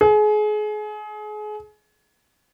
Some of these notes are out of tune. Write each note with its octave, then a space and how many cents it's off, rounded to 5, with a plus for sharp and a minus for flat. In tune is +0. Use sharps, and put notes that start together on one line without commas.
G#4 +30